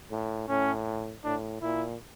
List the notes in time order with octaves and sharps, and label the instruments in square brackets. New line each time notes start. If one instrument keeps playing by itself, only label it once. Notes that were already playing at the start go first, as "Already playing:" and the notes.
[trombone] A2
[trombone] A2 [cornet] C#4
[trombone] A2 [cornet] D4
[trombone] A#2 [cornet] E4